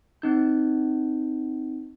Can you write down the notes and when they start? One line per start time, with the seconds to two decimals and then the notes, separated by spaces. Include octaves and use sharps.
0.22 C4 D#4 G6